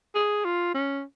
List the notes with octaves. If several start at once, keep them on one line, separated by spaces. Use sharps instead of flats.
G#4
F4
C#4